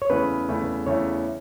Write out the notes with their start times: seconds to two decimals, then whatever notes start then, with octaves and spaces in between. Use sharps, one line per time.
0.02 C#5
0.10 E2 C#3 A3 E4 B4
0.49 E2 C#3 A3 E4
0.86 E2 C#3 A3 E4 C#5